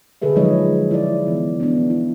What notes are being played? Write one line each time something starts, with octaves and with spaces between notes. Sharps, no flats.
D3 G#4 A4 B4 E5
F3 F#3 G#3 D#4 C#5 D#5
E4 D5
E3 B3
B3 D4
E4